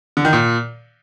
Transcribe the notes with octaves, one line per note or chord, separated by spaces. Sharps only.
D3
D#3
A#2